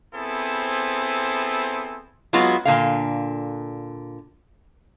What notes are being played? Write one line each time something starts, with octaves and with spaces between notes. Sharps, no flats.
B3 C4 E4 G#4 A4 C5
F#3 G#3 B3 F4 F#4
A#2 D3 F5